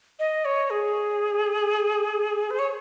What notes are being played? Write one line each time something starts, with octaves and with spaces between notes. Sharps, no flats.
D#5
C#5
G#4
C5
C#5